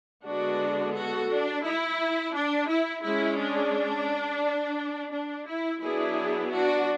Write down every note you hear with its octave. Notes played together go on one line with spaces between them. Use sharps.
D3 G#3 B3 D4 F#4
F#4 A4
D4
E4
D4
E4
G#3 C#4 E4
D4
D4
E4
F#3 B3 D4 E4 G#4
D4 F#4